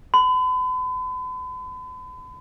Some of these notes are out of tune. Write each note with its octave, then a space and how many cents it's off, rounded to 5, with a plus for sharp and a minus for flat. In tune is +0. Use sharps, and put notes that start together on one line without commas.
B5 +40